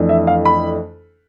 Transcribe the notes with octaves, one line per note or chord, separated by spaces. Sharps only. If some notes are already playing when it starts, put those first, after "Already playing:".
Already playing: F2 E3 A3 D4
E5
F5
B5